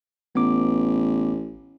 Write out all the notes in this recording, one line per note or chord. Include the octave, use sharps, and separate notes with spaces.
A1 B3 D6